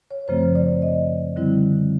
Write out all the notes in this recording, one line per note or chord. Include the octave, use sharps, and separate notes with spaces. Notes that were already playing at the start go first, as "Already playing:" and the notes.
C#5
F#2 C#3 F3 A3 C4 C5
D5
D#5
D3 G3 C4 E4